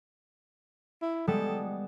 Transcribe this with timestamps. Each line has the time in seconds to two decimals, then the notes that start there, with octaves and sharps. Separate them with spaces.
1.02 E4
1.28 G3 G#3 B3 A4